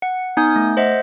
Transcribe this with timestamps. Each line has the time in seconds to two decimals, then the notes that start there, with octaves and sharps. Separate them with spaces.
0.02 F#5
0.37 B3 D#4 G#5 D#6 G6
0.56 A3
0.77 C5 D#5 E5 F#5